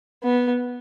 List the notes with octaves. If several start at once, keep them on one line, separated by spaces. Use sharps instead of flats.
B3